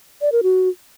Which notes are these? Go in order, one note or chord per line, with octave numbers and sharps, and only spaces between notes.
D5
A#4
F#4